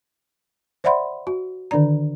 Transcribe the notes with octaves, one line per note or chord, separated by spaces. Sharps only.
C5 D5 E5 F#5 B5 C6
F#4
D3 D#3 D4 D5 A#5